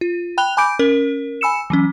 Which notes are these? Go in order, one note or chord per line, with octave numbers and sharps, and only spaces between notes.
F4
G5 B5 F#6 F7 G7
G#5 B5 D6 G6 D7
C#4 A#4
G#5 B5 E6 C#7 E7
E3 F#3 C#4